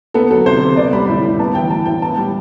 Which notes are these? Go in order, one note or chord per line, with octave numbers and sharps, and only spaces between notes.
B3 A4
F#3 A4
C3 C5
C3
B3 D5
G3 B5
A2
A2
B3 A5
E3 G5
A2 A5
A2 G5
B3 A5
G3